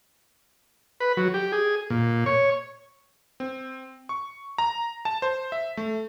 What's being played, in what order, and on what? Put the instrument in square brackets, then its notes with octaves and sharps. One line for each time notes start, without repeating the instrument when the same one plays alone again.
[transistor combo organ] B4
F#3
G4
G#4
A#2
C#5
[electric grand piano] C4
C#6
A#5
A5
C5
E5
A3